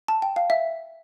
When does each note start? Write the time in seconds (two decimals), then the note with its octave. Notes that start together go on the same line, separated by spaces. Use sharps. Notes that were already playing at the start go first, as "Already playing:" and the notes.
0.08 A5
0.22 G5
0.36 F5
0.50 E5